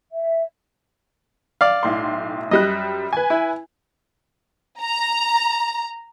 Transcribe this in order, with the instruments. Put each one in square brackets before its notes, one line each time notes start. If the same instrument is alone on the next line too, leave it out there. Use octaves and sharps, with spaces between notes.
[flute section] E5
[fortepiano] D5 F5
[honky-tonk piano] B1 A2 C6
[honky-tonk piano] F#2 G3 F#6 [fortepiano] D#5
[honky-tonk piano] B4 G#5
[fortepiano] E4
[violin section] A#5